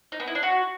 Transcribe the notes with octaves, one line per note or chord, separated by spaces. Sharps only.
D#4
B3
E4
D4
F#4